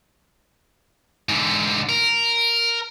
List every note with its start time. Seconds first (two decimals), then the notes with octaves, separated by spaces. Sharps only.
1.29 G#2 D3
1.89 A#4